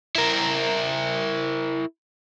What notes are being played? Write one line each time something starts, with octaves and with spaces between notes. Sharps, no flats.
E4 A#4